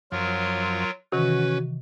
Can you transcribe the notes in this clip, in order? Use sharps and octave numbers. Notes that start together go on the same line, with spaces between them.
F#2 F3 F#3 F4 A#4
C3 D#3 E3 C#4 F#4 B4